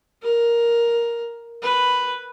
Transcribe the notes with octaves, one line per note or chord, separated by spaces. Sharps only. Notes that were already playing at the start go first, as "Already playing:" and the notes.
A#4
B4